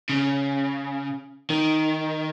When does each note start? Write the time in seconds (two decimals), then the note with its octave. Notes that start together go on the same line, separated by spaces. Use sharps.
0.09 C#3
1.50 D#3